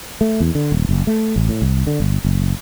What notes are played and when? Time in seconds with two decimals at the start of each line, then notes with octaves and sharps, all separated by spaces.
0.21 A3
0.40 E2
0.55 D3
0.72 D#1
0.89 F#1
1.07 A3
1.36 A1
1.49 A2
1.62 C2
1.87 D3
2.00 G1
2.24 F#1